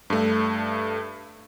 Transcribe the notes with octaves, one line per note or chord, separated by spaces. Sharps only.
G2 A3